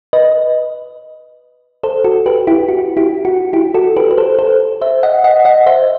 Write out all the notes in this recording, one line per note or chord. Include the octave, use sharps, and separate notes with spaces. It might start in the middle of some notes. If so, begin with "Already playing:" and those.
B4 D#5
A4 C5
F#4 A4
G4 B4
E4 G4
F#4
E4 G4
F#4
E4 G4
F#4 A4
G4 B4
B4
A4 C5
A4 C5
C5 E5
D#5 F#5
D#5 F#5
D#5 F#5
C5 E5